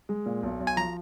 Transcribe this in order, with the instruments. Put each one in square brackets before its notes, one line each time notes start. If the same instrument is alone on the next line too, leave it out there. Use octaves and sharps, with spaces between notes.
[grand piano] G#3
A#2
B1
B1
[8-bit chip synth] G#5
[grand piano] F3 [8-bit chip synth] A#5